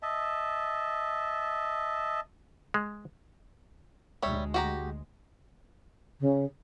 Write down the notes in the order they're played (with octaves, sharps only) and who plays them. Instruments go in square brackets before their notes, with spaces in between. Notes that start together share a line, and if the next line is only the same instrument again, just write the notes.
[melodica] D#5 E5 A5
[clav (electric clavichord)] G#3
[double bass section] D2 G#3 [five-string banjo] G3 C#5 E5
[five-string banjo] F#4 G4 A#5
[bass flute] C#3